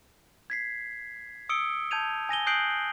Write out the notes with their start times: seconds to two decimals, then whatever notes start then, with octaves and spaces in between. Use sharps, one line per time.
0.50 G#6 B6 C7
1.49 D#6 E6 C#7 D7 G7
1.91 A5 G6 G#6 D#7 F7
2.29 G#5 A#6 D#7 G7
2.47 D#6 F#6 G6 C7 D7 F#7